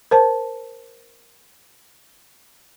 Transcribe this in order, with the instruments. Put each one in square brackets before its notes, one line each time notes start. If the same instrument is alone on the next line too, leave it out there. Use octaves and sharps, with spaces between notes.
[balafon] A#4 C5 A5